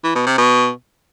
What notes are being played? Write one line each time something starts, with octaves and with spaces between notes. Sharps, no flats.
E3
B2
C3
B2